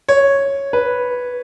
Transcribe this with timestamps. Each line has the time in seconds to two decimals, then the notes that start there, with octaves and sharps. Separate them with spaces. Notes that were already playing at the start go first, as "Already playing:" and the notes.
0.09 C#5
0.73 B4